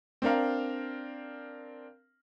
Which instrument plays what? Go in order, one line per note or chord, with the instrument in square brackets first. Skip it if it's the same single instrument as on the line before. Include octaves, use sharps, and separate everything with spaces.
[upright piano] C4 D4 A#4 F5